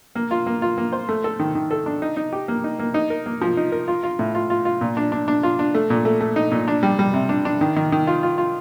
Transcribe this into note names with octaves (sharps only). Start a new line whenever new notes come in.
A#3
F4
A#3
F4
A#3
C5
A3
A4
D#3
D#3
A4
D4
D#4
D#4
G4
A#3
D#4
A#3
D#4
A#4
A#3
F3
D#4
A#4
F4
F4
A2
F4
F4
F4
A#2
D4
D4
D4
F4
D4
A3
A#2
A3
A3
D#4
A#2
D4
G3
G3
C3
D4
D4
D#3
D#3
D#3
F4
F4
F4